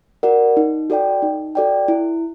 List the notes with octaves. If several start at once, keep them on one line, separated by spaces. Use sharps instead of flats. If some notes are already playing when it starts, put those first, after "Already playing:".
F#4 A#4 D5 F#5
D#4
F#4 A4 D5 G5
D#4
F#4 A4 D5 G5
E4